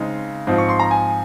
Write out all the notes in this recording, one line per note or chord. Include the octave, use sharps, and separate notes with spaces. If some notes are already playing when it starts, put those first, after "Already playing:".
Already playing: C#3 G#3 C4 D#4
G#2 F3 C4 D#4
C#6
C6
A#5
G#5